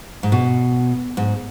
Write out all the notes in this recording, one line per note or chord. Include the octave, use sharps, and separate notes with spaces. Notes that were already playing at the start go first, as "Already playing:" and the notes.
G#2
B2
G#2